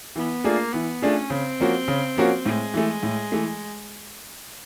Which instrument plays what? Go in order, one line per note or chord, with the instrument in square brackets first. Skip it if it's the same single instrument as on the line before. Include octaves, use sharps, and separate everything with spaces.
[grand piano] E3 [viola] B3
[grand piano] A3 D4 F4 G#4 [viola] A#3
[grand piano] E3 [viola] B3
[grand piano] A3 D4 F4 G#4 [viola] C#4
[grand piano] C#3 [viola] C4
[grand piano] F3 A#3 C#4 F#4
C#3
F3 A#3 C#4 F#4
[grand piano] A2 [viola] G#3
[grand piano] E3 A3
A2
E3 A3